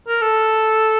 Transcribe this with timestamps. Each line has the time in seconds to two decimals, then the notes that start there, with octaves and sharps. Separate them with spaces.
0.08 A#4
0.22 A4